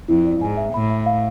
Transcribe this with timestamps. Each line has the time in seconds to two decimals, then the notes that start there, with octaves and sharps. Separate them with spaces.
0.08 F2 E4
0.25 D5
0.41 G#2 G#5
0.57 E5
0.74 A2 B5
0.90 E5
1.06 F5